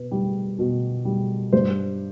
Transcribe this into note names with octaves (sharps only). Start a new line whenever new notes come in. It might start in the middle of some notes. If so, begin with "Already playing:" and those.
Already playing: B2 B4
G3
B2
G3
G2 C5